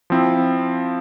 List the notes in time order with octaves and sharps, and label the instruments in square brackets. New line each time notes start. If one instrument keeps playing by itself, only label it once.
[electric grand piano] F3 C4 E4